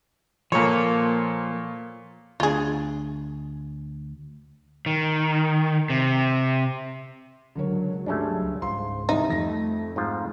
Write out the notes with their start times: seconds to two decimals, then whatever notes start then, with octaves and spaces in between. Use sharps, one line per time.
0.52 A#2 F3 A#3 A4 C#5
2.40 D2 D4 F4 G#4
4.86 D#3
5.90 C3
7.55 C#2 D3 F#3 A#4 C#5
8.06 G2 G#3 A3 C#4 D4
8.62 C#2 G#2 F3 C6
9.09 C2 G3 D#4 E5
9.29 F2 A3 A#6
9.96 G#2 F3 F4